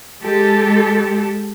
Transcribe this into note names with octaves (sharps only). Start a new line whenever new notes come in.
G#3 G4 A4